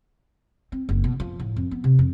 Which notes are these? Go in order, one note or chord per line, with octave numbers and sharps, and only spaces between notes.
C4
F#1
B2
F3
A2
F2
B3
C3
F2